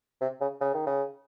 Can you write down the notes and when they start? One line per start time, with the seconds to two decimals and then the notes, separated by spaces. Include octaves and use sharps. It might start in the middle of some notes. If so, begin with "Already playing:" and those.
0.21 C3
0.41 C#3
0.61 C#3
0.74 D#3
0.86 C#3